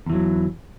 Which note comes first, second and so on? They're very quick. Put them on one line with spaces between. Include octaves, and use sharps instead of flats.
E2 E3 F#3